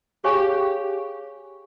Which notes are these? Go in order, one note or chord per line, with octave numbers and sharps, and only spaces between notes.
G4 G#4 C#5 F5 G#5 C#6